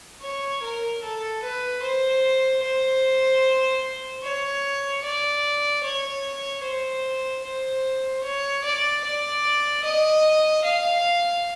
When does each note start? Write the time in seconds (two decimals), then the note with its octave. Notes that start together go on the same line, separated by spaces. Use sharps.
0.22 C#5
0.63 A#4
1.03 A4
1.43 B4
1.82 C5
2.62 C5
4.23 C#5
5.04 D5
5.83 C#5
6.63 C5
7.44 C5
8.23 C#5
8.64 D5
9.04 D5
9.84 D#5
10.64 F5